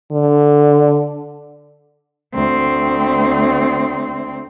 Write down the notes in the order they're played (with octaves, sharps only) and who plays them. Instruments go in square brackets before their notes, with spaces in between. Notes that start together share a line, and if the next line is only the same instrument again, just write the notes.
[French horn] D3
[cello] D2 C4